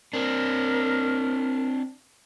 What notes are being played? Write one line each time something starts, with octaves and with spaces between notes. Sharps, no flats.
C4 D4 A#4